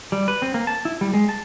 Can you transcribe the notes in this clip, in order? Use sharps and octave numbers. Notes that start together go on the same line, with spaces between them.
G3
B4
C4
A#3
A5
E4
G3
G#3
A5